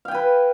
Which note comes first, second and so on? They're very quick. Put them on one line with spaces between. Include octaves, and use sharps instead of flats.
F5 G5 G#5 B4